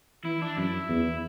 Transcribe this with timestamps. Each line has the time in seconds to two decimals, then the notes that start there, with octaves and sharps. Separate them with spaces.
0.24 E3 E4
0.42 D4
0.57 F#2 E4
0.89 E2